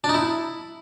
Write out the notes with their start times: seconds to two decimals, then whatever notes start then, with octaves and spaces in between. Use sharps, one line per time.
0.04 D4
0.09 D#4
0.14 E4